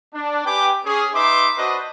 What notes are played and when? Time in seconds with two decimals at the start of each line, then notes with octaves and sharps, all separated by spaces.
0.14 D4
0.46 G4 B4 G5 G#5 D6
0.85 C#4 G#4
1.14 D#4 B4 E5 C6 D6
1.58 D4 F#4 B4 C5 D#5